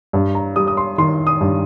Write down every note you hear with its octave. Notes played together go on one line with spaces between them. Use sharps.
G2
A#5
G3 D#6
D#6
C6
D#3 C6
D#6
G2